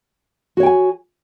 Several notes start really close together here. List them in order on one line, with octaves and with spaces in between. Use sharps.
F#4 C#5 G5 G#5